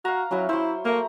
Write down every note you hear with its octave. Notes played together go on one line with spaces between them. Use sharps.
F#4 F5 A#5
F#3 C#4 E4 B4
F#3 E4 C5
A3 A#3 A#5